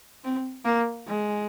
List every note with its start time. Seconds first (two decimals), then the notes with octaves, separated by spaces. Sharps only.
0.24 C4
0.65 A#3
1.07 G#3